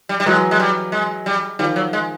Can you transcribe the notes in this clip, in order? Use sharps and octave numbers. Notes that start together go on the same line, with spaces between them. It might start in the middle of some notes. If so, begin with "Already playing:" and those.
G3
G3
E3 F#3 G#3
G#3
G3
G#3
G3
D#3 F3 G3
F#3
G#3